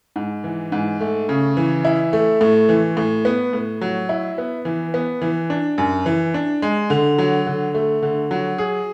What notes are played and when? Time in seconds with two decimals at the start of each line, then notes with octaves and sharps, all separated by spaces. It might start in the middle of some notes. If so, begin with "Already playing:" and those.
0.16 G#2
0.44 E3
0.72 G#2
1.00 A3
1.29 C#3
1.57 E3
1.85 E4
2.13 A3
2.41 A2
2.69 E3
2.97 A2
3.25 B3
3.53 A2
3.81 F#3
4.09 E4
4.38 B3
4.65 E3
4.94 B3
5.22 E3
5.50 D4
5.78 F#2
6.06 E3
6.34 D4
6.62 G#3
6.90 D3
7.18 F#3
7.46 D3
7.74 A3
8.02 D3
8.31 F#3
8.58 G#4